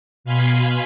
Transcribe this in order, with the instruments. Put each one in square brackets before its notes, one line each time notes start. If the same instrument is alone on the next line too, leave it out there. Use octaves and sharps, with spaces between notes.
[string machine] B2 F5 G#5 B5 C6 B6